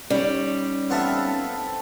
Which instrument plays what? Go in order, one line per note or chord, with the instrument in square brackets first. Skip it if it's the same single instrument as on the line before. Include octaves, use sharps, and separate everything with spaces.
[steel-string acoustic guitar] G3 [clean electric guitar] C#4 D#4 C#5
[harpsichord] B3 F4 E5 [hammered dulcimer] C4 A4